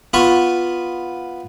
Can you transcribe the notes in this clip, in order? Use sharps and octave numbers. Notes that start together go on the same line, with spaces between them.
B3 F4 B4 B5 C#6